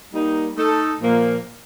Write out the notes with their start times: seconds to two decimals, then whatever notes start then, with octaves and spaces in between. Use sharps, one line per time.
0.13 G3 A#3 D#4
0.56 A3 D#4 A4
1.00 A#2 F3 A#3